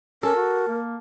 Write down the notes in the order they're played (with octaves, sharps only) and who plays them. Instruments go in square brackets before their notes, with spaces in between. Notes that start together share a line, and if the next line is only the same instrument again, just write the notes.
[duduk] C#4 [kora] A4 [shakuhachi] A#4
[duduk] F#4
A#3